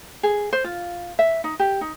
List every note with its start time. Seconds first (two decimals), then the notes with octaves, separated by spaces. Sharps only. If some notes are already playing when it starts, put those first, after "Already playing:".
0.23 G#4
0.53 C5
0.64 F4
1.19 E5
1.44 D#4
1.59 G4
1.81 D#4